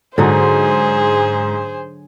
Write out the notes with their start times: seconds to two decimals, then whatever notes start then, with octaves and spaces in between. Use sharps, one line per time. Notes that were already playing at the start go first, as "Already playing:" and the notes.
0.18 G#2 D3 F#3 D#4 G#4 C5